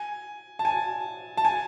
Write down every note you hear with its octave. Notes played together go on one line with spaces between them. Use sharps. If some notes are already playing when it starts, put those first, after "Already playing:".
Already playing: G#5
A5
G#5
A5
G#5